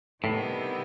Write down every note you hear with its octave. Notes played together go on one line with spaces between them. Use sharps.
A2 C3 D#3 G3 B3 E4